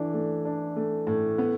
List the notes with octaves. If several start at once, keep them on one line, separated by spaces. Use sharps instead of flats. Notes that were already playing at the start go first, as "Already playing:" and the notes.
Already playing: E3 A3 D4
A3
D4
A3
A2
B3